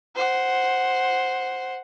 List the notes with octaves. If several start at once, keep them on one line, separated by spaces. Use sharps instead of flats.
C5 F#5